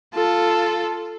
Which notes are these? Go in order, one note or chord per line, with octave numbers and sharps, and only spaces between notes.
F4 A4